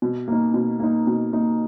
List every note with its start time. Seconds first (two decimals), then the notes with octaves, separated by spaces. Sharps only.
0.02 B2
0.28 A#3 D#4
0.54 B2
0.80 A#3 D#4
1.07 B2
1.33 A#3 D#4